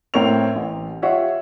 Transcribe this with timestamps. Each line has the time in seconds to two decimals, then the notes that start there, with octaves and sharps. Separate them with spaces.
0.14 A2 C4 A#4 C#5 C#6 F7
0.55 A1
1.02 F4 G4 C#5 E5 F#5